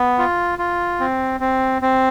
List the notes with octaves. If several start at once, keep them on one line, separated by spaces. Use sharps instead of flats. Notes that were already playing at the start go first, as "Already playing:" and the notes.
Already playing: B3
F4
F4
C4
C4
C4